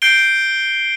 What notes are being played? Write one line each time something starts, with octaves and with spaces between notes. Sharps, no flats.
G6 C7 D7 G7